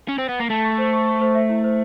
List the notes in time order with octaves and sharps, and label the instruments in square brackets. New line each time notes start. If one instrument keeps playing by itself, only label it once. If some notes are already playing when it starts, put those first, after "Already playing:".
[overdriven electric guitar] C#4
C4
B3
A#3
[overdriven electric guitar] A3 [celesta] A5
[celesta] C#6
C5
C#6
C#6
C5
E5
E4
C5